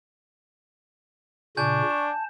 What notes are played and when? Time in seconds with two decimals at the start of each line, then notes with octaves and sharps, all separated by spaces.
1.57 A#2 C#3 D4 G#5 C#6 G6
1.90 A5